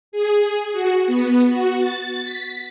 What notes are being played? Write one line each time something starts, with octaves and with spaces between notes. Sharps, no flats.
G#4
F#4
B3
F#4
A6
B6